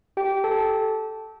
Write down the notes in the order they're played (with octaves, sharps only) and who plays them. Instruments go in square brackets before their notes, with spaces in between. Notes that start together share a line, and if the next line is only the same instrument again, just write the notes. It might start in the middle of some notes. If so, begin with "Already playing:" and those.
[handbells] G4 G5
A4 A5